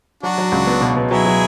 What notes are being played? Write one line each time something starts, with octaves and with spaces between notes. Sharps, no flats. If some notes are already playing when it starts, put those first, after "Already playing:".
F#3 D4 F#4
F#3
C#2
B3
B2
B2
F#3 E4 G#4
F#3